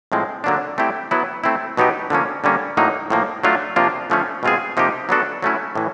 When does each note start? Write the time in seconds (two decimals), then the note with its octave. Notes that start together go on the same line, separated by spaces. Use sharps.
0.12 A2 F3 G#3 C4
0.44 D3 F#3 A#3 D4
0.78 A3 C4 E4 G4
1.11 F#3 B3 E4
1.44 A3 C4 E4
1.77 B2 F#3 B3 D#4 G4
2.10 D3 F3 A#3 C#4
2.44 D3 G3 A#3 C#4
2.77 A2 F#3 A#3 D#4
3.10 A2 F3 A#3
3.44 F#3 A3 D4 F4
3.76 C3 F3 A#3 D4 F4
4.10 D3 F3 A3 C#4
4.43 B2 G#3 C4 F4 G#4
4.77 C3 F3 A#3 D#4 G4
5.09 F#3 B3 D4 F#4 A4
5.42 F#3 A3 C#4 E4
5.75 A2 E3